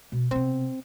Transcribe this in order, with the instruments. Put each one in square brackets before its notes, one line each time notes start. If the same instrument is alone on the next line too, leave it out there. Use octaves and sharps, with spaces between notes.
[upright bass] B2
[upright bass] C3 B3 [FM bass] C4